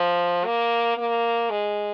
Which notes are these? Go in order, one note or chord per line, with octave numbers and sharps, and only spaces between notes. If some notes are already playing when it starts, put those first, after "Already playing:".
Already playing: F3
A#3
A#3
G#3